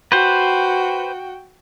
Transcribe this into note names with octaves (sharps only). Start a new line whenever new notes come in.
F#4 B4 C5 G5